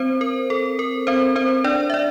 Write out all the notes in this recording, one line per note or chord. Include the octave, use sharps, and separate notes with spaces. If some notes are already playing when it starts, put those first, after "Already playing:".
Already playing: C4 C5
A#4
A4
A#4
C4 C5
C4 C5
D4 D5
E5
D4 D5